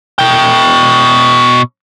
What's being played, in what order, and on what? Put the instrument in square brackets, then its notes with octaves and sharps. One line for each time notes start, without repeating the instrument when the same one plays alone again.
[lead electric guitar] B2 G5